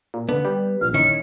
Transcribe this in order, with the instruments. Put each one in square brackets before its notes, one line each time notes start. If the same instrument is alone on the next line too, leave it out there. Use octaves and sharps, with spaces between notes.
[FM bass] A#2
[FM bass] D3 [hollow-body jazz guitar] B3
[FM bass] G3
[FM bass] A#1 [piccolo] F6
[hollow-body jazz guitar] D#3 C#4 E4 [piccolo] C#7